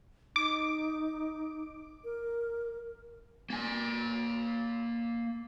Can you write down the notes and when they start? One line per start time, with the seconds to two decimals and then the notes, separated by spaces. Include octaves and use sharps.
0.36 D#4 D6
2.04 A#4
3.50 A#3 G#5